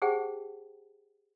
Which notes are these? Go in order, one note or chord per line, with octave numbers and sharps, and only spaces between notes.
G4 G#4 C5 F#5 G5 A5